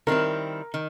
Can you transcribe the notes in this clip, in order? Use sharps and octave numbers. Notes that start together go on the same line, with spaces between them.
D#3 G3 C4 E4 A#4
D#3